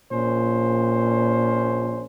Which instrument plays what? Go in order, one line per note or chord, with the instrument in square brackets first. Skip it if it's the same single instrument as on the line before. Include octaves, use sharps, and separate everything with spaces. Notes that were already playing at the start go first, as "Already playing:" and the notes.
[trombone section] A#1 C#4 C5 [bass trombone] A#2